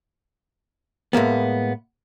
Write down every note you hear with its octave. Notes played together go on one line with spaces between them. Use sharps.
A2 G#3 A#3 B3